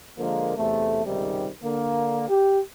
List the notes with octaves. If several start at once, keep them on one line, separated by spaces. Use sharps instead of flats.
D3 F3 G#3 A#3
E2 C3 A3
C#2 G#2 C3 D#3 G3
D3 A#3
G4